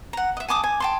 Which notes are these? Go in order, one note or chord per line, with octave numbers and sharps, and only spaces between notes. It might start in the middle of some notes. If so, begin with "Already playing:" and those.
F#5 A#5
D#5 E5
G#5 A5 D6 D#6
G#5
G5 A5 C6